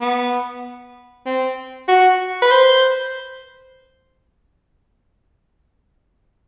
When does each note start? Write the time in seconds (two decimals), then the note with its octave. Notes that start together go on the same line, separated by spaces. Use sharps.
0.01 B3
1.26 C4
1.88 F#4
2.42 B4
2.51 C5